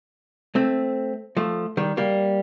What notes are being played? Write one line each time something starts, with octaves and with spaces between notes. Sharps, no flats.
A3 C4
F3 A3
D#3 G3
G3 A#3